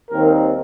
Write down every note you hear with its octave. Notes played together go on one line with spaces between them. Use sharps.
D#2 D#3 G3 C4 A#4